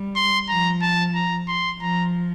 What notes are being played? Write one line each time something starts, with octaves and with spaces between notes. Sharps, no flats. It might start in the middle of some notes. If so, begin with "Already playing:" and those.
Already playing: G3
C6
F3 A#5
A5
A#5
C6
F3 A#5